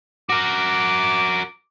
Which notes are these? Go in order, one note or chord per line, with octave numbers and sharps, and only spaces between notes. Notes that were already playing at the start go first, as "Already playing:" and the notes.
F#4 A#4 D6